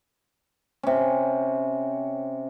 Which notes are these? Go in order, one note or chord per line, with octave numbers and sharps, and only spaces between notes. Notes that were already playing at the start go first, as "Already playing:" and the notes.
C3 C#4